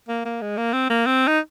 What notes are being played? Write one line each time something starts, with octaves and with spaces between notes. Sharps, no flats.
A#3
A#3
G#3
A#3
C4
A#3
C4
D#4